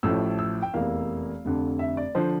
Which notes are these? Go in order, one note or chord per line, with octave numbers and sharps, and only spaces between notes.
A1 A2 F3 A3 E4 E6
E6
G5
F1 E2 E3 A#3 F5
F1 F2 D3
E5
D5
D3 F3 C5